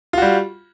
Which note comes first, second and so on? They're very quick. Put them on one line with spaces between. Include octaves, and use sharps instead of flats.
F4 F#4 G3